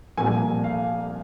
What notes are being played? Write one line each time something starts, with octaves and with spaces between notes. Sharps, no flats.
C2 A#2 F3 G#5
F5